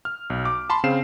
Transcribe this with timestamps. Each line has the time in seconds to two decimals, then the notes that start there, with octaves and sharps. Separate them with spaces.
0.05 F6
0.30 B1
0.45 D6
0.70 A5 B5 C6
0.84 C#3 C4 F5 C7 E7